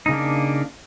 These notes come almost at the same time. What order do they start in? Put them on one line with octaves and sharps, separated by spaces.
D#4 C#3 A#3 D4